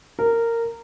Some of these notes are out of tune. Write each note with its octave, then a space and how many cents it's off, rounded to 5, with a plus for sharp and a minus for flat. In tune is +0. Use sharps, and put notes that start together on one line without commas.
A#4 -15